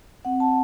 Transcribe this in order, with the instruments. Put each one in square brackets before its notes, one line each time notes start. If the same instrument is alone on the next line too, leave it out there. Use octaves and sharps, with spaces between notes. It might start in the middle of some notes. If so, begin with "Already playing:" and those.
[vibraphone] C4 F#5
A5
C4